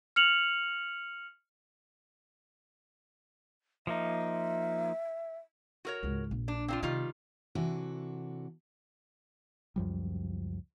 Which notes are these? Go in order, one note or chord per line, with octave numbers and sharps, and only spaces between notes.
F6 C#7 F7 F#7
F3 A#3 D#4 E5
F#4 A#4 C#5
C#2 G#2
A#1
D4
C4 D4 F4
C3 D#3 G3 F4
C3 E3 D4 F#4 A4
C#2 F#2 F3 G3